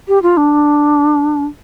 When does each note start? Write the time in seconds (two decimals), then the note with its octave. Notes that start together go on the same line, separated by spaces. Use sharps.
0.08 G4
0.22 F4
0.37 D4